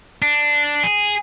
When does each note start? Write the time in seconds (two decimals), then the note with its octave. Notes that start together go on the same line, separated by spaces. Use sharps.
0.22 D4
0.83 G#4